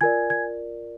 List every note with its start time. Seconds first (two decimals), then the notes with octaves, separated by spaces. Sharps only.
0.01 F4 A#4 D5 G#5 G#6
0.30 G#6